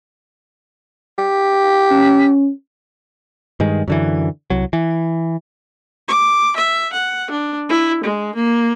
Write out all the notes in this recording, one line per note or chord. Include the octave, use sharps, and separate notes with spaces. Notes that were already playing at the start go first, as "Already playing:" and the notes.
G4
C#4
G2 D#3 G#3
F#2 D3 E3
C2 F#3
E3
D6
E5
F#5
D4
E4
G#3
A#3